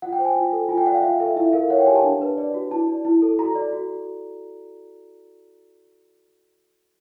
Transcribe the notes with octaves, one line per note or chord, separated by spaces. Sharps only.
F4 F#5
G5
C5
G#5
F4
A4
F4 G#5
G5
D5 F#5
F5
F4 E5
A4 E5
E4 E5
A#4 F5
C#5 F#5
G5
G4 G#5
A5
D4
B4
D5
F#4
E4 A5
D5
E4
A4
F#4 A#5
D5
F#4